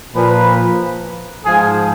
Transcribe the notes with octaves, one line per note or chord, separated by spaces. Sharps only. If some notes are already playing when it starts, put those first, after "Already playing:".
A#2 F3 B4
G#2 F3 G#4